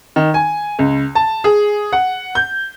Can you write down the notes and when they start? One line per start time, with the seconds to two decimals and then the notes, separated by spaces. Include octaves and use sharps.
0.16 D#3
0.34 G#5
0.79 C#2
1.15 A5
1.44 G#4
1.93 F#5
2.35 G6